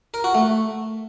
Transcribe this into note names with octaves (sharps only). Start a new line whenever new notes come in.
A#4
F#4
A3